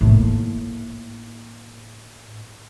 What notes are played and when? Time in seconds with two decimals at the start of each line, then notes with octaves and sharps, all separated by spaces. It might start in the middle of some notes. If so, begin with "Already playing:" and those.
0.01 A2 A#3